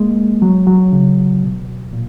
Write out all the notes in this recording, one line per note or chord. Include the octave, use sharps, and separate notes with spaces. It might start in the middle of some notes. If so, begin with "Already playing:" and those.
Already playing: G#3 A#3
F#3
F#3
C#3
B2
A#2